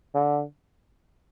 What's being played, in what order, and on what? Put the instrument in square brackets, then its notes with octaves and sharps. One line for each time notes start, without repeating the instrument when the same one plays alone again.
[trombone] D3